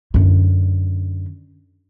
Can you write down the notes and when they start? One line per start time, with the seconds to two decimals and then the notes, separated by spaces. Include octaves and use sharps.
0.14 F#2 D3